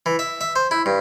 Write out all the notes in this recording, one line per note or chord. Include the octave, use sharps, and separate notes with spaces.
E3
E5
E5
C5
E4
G2